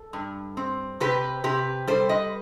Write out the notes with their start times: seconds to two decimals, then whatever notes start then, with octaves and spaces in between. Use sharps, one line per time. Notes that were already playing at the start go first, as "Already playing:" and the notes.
Already playing: A4
0.13 G2
0.57 C4
1.00 C3 G4 B4
1.44 C3 G4 B4
1.87 G3 A4 C5
2.09 B4 D#5